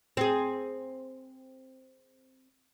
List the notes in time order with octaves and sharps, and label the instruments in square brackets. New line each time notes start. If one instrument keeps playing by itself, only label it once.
[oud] C4 G#4